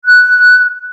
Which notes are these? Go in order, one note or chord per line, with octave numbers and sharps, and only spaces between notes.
F#6